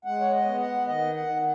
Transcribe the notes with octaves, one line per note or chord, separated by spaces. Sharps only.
G#3 F#5
C#5
D#5
B3
F#5
D#3 D#5
F#5
D#3